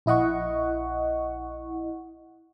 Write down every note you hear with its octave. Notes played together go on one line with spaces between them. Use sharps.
A#1 E4 D#5 F#5 C#6